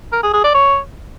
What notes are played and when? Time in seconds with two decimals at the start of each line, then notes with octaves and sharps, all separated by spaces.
0.13 A#4
0.23 G#4
0.33 G#4
0.44 D5
0.54 C#5